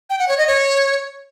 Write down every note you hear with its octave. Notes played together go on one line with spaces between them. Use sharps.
G5
F#5
C#5
D#5
C#5